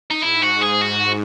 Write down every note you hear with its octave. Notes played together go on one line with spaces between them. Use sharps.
D#4
G#2 E4
F#4
G#4
F#4